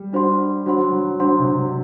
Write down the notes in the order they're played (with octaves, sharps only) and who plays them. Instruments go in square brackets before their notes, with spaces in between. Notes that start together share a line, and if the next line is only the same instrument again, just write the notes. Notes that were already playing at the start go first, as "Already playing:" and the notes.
Already playing: [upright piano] G3
[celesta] D4 F#4 C5 F#5 C6
[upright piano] F#3 [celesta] D4 F#4 C5 F#5 C6
[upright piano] F#3
[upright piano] F#3 [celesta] D4 F#4 C5 F#5 C6
[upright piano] C3
D3